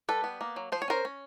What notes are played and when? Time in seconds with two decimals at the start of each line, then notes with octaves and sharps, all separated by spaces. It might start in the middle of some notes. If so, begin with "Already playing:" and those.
0.09 G3 A4 B4
0.24 B3
0.41 A#3
0.56 F#3
0.72 F3 C5
0.82 C#5
0.88 C#4 A#4 C5
1.05 C#4